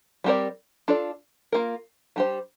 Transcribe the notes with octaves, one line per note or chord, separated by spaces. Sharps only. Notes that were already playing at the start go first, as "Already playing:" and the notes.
G3 C4 G4 A#4 D5
D4 F4 A4 D5
A#3 F4 A#4
G3 D4 G4 C5